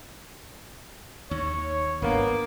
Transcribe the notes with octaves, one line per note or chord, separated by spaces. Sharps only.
D#2 C#5
G#1 G2 A#3 B3 D4